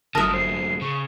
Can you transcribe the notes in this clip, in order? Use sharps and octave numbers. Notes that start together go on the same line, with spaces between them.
G1 F#2 D3 A#4 E5 A5 D#6 F6
C5 C7
C#3 C#6